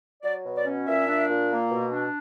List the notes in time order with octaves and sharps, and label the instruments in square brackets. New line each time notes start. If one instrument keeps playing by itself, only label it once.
[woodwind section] F#3 D5
B2
D5
C#4
A#2 E5
D4
A#2
A#3
B2
D4